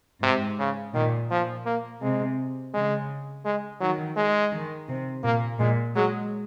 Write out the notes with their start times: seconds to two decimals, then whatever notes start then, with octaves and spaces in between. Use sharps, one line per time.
0.22 G#2 C3
0.59 C#3
0.94 A#2 D#3
1.31 A#2 F3
1.66 A#3
2.01 C3 G#3
2.73 C#3 G#3
3.45 G#3
3.80 D#3 F#3
4.16 G#3
4.52 D#3
4.89 C3
5.23 A#2 A#3
5.59 A#2 G#3
5.95 F#3 G#3